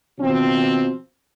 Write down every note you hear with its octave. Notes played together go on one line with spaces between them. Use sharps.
B2 D#3 F3 C4